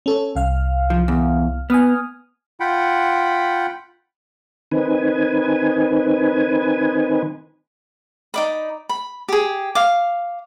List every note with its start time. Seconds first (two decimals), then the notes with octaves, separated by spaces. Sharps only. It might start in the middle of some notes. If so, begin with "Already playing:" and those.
0.06 C#4 A4 C#5
0.35 C2 F5 F6
0.90 F3
1.08 E2
1.70 B3 G#5 D#6 F6
2.60 F4 F#5 G5 B5
4.71 D#3 C4 D#4 B4 G#5
8.34 D#4 D5 B5
8.89 B5
9.29 G4 G#4
9.75 F5 D6